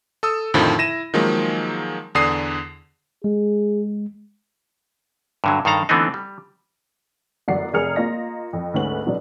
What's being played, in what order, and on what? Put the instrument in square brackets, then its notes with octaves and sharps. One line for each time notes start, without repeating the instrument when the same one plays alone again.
[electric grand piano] A4 D#6 E6
F2 A2 D3 D#3 F3
E4 A#6 D#7 E7
D#3 F3 F#3 G#3 A#3
E2 D3 D4 D#6 C7
[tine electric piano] G#3 [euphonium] G#4
[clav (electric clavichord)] G2 D3 F#3
G2 D#3 A4 F5 A#5
D3 E3 A3 B3 C4 D#4
G3
[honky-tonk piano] G1 F#2 F#4 D5 F#5 C7
F1 G#4 A#4 F6 C#7 F7
A#3 F4 D#5 A#6
F2
D2 G#2 C#4 B4 F#5 F#7
B2 F#3 B3 D4